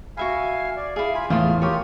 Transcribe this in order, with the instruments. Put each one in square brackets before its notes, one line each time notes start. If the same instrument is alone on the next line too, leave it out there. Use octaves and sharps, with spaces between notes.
[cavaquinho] F#4 E5 B5 [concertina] F5 G#5
[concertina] D5
[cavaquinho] E4 G#4 [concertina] F5
[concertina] F4 G#5 B5
[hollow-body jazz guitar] E2 A2 [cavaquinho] F4 D#6 [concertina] F6
[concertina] F4 G4 A#4 [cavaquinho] C#5 D#6